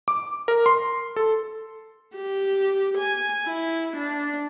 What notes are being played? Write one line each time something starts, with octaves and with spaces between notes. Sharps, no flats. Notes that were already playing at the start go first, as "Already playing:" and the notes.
D6
A#4
C6
A4
G4
G#5
E4
D4